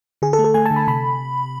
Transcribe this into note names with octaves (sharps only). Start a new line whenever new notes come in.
D3 G#4
A4
A3
A4
A3 G#5
A5
D3
B5
C3 B5